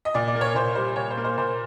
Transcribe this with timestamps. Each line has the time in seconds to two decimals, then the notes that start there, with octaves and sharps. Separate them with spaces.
0.05 D#5
0.14 A#2 D5
0.28 D5
0.35 A#3
0.41 C#5
0.55 A#2 C5
0.75 G3 C5
0.96 A#2 C#5
1.10 C5
1.17 A#3
1.24 C5
1.38 A#2 C5